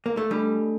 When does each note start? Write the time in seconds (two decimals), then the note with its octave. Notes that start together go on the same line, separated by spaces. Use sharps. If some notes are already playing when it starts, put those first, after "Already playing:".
0.06 A#3
0.17 A3
0.31 G3 A3 D4 A4